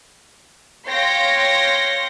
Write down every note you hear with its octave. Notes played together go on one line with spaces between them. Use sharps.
C#5 F5 G5 C6 A#6